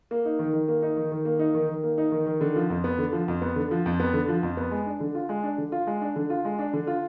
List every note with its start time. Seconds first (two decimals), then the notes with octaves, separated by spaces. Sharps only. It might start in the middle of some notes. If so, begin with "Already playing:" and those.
0.11 A#3
0.25 D#4
0.39 D#3
0.53 D#3
0.68 A#3
0.82 D#4
0.97 D#3
1.12 D#3
1.25 A#3
1.39 D#4
1.55 D#3
1.69 D#3
1.84 A#3
1.98 D#4
2.12 D#3
2.26 D#3
2.41 D3
2.56 F3
2.70 F2
2.84 B3
2.98 D3
3.13 F3
3.28 F2
3.42 B3
3.56 D3
3.71 F3
3.86 F2
4.00 B3
4.13 D3
4.29 F3
4.43 F2
4.57 B3
4.71 G#3
4.86 D4
5.00 D3
5.15 F4
5.29 G#3
5.43 D4
5.58 D3
5.72 F4
5.87 G#3
6.02 D4
6.16 D3
6.30 F4
6.45 G#3
6.59 D4
6.73 D3
6.87 F4